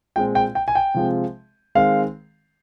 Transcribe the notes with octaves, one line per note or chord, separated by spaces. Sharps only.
A#2 G#3 C4 G5
G5
G5
G#5
G5
C3 F3 G#3 C4
D#3 G#3 C4 F5